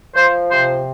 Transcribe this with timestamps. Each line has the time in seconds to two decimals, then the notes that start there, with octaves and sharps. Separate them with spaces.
0.15 F3 C5
0.51 C3 C5